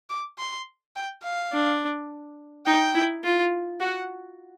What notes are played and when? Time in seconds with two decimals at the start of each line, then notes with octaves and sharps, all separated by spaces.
0.10 D6
0.38 C6
0.96 G5
1.24 F5
1.53 D4
2.67 D#4 G5
2.95 E4
3.24 F4
3.80 F#4 F#5